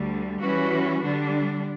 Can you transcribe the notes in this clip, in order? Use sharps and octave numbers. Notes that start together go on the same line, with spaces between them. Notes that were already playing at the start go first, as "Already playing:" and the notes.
Already playing: D2 D3 G3
E3 G3 C#4 F#4 B4
D3 G3 D4